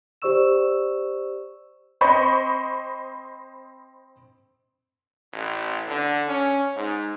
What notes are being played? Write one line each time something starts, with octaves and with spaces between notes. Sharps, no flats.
G4 C5 D5 C#6 E6 E7
C4 C5 D#5 B5 C#6
A1
D3
C#4
G#2